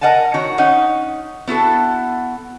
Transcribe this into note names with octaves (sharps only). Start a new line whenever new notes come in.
A#4 D#5 F#5 G#5 A5
D#3 F#4 C#5
C#4 D#4 F#5
B3 E4 F#4 A4